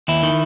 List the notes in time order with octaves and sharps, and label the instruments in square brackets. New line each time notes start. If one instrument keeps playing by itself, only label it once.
[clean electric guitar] D#2 E4
D#3